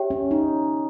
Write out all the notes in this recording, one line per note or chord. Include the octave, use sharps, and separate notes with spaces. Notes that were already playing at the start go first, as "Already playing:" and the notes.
Already playing: G4 C#5 E5 G5
C#4
D#4